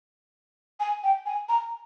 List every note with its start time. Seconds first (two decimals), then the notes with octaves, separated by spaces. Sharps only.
0.80 G#5
1.03 G5
1.26 G#5
1.49 A#5